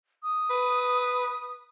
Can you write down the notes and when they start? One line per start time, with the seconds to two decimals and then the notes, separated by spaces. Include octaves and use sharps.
0.23 D#6
0.50 B4